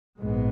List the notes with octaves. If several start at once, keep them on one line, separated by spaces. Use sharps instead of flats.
A#1 G#2 G#3 B3